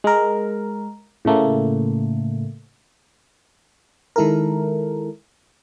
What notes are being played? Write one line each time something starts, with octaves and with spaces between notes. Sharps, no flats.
G#3 A#4
A2 C#3 A3 A#3
D#3 G#3 E4 A4 A#4